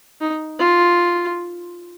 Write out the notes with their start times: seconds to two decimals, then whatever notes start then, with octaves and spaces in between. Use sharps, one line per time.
0.21 D#4
0.59 F4